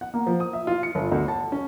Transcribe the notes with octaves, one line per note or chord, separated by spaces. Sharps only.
F#5
A#3
F3
D#6
E5
F4
C#7
G1
D2
A5
C#4